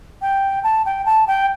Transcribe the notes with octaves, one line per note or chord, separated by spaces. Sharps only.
G5
A5
G5
A5
G5